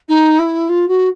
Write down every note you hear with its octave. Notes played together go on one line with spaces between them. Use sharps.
D#4
E4
F4
F#4